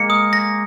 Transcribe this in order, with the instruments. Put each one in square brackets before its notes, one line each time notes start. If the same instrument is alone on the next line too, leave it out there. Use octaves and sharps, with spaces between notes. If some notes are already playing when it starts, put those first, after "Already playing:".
Already playing: [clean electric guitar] G#3 A#3 [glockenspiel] C#7
[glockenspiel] D#6
A#6